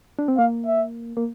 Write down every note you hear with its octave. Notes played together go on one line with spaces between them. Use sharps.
D4
C4
A#3 F5
E5
A#3